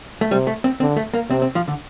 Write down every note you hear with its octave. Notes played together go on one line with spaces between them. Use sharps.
A3
C3 G3
A3
C4
D3 C4
A3
A#3
C3 C4
C4
F3
D3